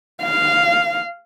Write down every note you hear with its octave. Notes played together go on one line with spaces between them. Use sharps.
F5